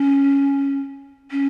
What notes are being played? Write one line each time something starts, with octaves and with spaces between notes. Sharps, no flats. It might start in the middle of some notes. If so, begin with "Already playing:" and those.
Already playing: C#4
C#4